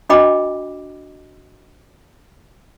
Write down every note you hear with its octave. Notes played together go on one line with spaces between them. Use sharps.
D4 F#4 D#5 G5 B5 D6